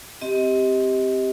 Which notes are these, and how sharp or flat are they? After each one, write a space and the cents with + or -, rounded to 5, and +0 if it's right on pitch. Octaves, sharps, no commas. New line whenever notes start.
C4 +0 G4 +0 D#5 +30